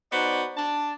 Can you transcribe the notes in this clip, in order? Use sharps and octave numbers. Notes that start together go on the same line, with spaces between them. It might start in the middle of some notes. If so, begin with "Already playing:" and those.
B3 D#4 F#4 C5 D5 F#5
D4 A5